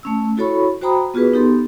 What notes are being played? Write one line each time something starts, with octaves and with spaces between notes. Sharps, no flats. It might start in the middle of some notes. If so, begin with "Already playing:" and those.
A3 C#4 E6
E4 F#4 A4 C#5 B5 C#6
F#4 C5 G5 A#5 B5 D#6
B3 F4 F#4 G#4 B4
B3 D#4 G4 A4 C6